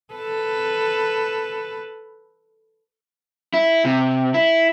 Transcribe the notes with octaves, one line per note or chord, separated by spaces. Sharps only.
A4 B4
E4
C3
E4